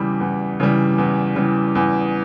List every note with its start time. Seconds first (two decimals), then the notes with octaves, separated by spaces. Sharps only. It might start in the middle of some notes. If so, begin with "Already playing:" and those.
Already playing: E2 C#3 E3 G3 B5
0.20 E2
0.60 C#3 E3 G3
0.98 E2
1.36 C#3 E3 G3
1.75 E2